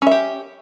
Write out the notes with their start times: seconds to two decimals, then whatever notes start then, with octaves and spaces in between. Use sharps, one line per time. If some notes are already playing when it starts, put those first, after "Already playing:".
0.02 C#4
0.07 E5
0.11 G4